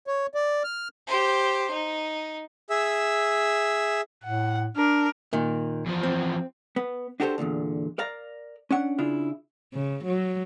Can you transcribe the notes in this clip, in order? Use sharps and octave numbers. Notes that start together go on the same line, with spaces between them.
C#5
D5
F6
G4 C5
D#4
G#4 E5 E6
A2 F#5
D4 A#4
A#2 D#3
E2 F3
C4
B3
D4 F#4 G4 A4 A#4 C5
E2 G2 A#2 D3
A#4 D5 F5 A#5
C#4 D4 F#5
C#3 D4 E4 F4
C#3
F#3